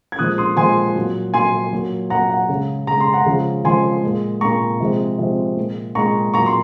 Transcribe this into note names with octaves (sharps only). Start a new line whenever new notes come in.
G#6
A#2 F3 G#3 D#6 F#6
C6 D#6
A#2 F3 G#3 G#5 C6
A#2 F#3
A#2 F#3 G#5 C6
A#2 F#3
A#2 F#3 F#5 A#5
F#5
C#3 G#3
C#3 G#3 A#5
C6
F#5 A#5
C#3 F3 G#3
C#3 F3 G#3 G#5 C6
A#2 G#3
A#2 G#3 A#5 C#6
C3 F3 G#3
C3 F3 G#3
A#2 G#3
A#2 G#3 A#5 C#6
A#2 F#3 A#5 C#6
C6